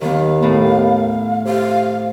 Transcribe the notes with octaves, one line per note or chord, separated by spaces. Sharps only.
D#2 D#3 B3 F5
A2 B3
C3 F5